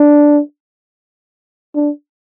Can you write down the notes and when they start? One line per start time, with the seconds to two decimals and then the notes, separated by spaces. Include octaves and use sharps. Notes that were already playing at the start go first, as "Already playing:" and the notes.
Already playing: D4
1.75 D4